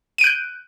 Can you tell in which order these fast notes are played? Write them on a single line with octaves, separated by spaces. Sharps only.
D#7 D7 F#6 G6